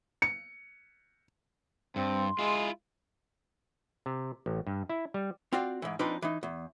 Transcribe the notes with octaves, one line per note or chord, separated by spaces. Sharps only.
C#7
G2 C4 C6
G#3 E4 F4
C3
A1
G2
E4
G3
C4 F4 F#4 D5 F5
G#2 E3
F3 C4 D4 D#4 B4 D5
E3 D#4
E2